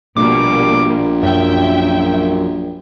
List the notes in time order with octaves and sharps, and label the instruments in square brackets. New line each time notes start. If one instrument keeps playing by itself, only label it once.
[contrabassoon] A#1 [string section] B2 G3 A#3 [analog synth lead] D6
[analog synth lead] F#2 [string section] E5 G5